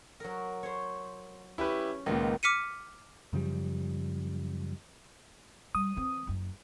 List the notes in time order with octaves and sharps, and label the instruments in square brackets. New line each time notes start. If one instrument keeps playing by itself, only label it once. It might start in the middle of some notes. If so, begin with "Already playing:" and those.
[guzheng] F#3 A#4
C5 C#5
[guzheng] C#4 [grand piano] E4 G4 B4
[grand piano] C#2 A#2 [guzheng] D#3 B3
[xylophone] D6 F6 B6 C#7 D#7
[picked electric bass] F#2 C#3 F3 G3
[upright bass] G3 [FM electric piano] D#6
[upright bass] E3 C4
F#1 F#2